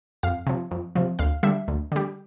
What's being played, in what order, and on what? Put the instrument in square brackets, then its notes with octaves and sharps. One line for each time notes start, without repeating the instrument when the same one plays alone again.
[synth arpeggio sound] F2 F5
C3 F3
F2
C3 F3
D2 F5
D3 G3 E5
D2
D3 G3